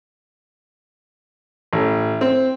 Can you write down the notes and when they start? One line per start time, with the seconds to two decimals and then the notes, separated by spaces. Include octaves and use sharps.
1.73 A1
2.21 C4